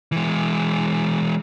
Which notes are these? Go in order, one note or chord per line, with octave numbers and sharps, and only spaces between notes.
E3 G#3